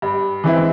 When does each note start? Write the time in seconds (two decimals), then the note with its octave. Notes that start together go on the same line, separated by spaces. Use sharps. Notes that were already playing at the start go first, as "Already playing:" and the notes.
0.02 G2
0.44 E3 G#3 C4 E4